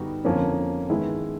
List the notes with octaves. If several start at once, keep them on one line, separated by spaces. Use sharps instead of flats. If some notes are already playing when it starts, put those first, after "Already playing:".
Already playing: D3 G3 B3 D#4 F#4
F2 D3 F3 A#3 C#4
D#3 G#3 B3 E4 G#4